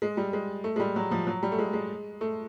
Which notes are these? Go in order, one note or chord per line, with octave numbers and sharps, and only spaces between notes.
G#3
G3
G#3
A3
G#3
G3
F#3
F3
F#3
G3
A3
G#3
G#3
A3